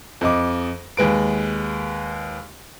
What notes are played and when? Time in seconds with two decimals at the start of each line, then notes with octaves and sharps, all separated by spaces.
0.21 F2 D#5 D6
0.97 D#2 G#3 B4 D7